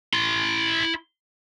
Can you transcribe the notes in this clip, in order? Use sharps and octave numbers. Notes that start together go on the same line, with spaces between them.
E4 C6